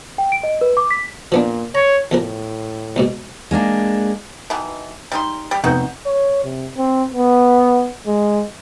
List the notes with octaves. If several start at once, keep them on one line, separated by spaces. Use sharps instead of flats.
G5
D7
D#5
B4
D6
B6
A#2 F3 B3 D4
C#5 A#5
E2 A2 F3 A#4
E2 G#2 B2
G#3 A#3 C#4 D4
B2 D#3 E3
G3 D#4 C6
G3 G4
F1 B3 C4 D#4 F#4 G6
C#5
C3
C4
B3
G#3